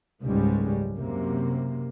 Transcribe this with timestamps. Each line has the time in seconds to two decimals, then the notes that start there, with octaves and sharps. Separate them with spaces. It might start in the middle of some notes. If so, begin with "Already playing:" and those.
0.22 F#1 C#2 G#2 G3 G#3 C#4
0.97 F#2 C3 A#3